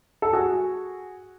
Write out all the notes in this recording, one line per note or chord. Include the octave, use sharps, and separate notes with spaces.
A4
F#4 G#4